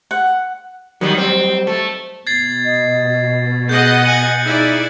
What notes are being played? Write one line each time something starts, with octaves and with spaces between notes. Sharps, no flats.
F#5
D#3 F#3 G3 B3
C4
A3
B2 G#6 A6 C7
D#5
B3 G#4 D#5 F#5 G6
G#5 F#6 C#7 F#7
D#4 E4 G#4 D5